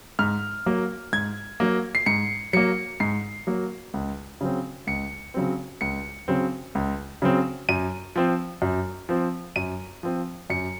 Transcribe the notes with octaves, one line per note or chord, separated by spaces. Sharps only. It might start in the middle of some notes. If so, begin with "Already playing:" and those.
G#2 F6
F#3 A#3
G#2 G#6
F#3 A#3
C7
G#2 C#7
F#3 A#3 C#7
G#2 C7
F#3 A#3
C#2
C#3 F#3 C4
C#2 C#7
C#3 F#3 C4
C#2 C#7
C#3 F#3 C4
C#2
C#3 F#3 C4
F#2 D#7
F3 C4
F#2
F3 C4
F#2 D#7
F3 C4
F#2 C#7